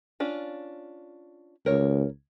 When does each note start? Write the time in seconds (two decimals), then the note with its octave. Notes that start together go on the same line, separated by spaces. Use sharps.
0.20 C#4 D4 F4
1.66 C#2 A#4 C#5